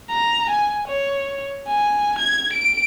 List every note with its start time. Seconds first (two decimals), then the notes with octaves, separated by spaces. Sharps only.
0.10 A#5
0.50 G#5
0.88 C#5
1.68 G#5
2.19 G#6
2.53 D7